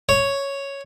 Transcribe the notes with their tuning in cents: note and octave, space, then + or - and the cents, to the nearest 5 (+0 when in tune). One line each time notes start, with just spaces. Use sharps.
C#5 +0